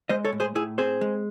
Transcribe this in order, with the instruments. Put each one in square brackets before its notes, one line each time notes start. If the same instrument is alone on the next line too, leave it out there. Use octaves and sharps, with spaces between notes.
[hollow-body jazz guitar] G#3 C5 D#5
A4 C#5
A2
G#4 C5
A2 E4 G#4
C4 G#4 C5
G#3